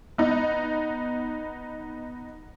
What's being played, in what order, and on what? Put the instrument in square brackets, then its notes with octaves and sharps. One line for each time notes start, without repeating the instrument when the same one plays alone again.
[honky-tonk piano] B3 D#4